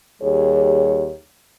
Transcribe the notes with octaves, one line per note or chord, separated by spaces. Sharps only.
D#2 G3 G#4 C#5